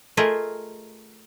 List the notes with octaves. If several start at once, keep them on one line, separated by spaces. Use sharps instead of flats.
A3 F4 G#4 A#4 D#5 E5